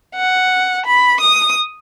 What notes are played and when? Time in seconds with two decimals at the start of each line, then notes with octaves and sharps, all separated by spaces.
0.15 F#5
0.86 B5
1.21 D#6